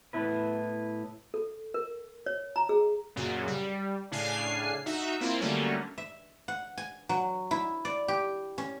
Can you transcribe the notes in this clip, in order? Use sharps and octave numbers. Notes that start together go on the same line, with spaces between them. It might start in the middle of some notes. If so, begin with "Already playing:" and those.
A2 B3 E4 B4
A4
A#4
C#5
A#5
G#4
F#2 A#2 C#3 F#3
G3
A2 C#3 D4 F5 G#5 C7
D#4 F#4 E5
A#3 C4 E4 F4
D3 F#3 G3 A3 A#3 C#4
E5
F#5
G#5
F#3
E4
D5
G4
C#4